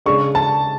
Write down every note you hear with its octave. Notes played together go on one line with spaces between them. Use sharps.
C#3 G#3 D4 C#6
A5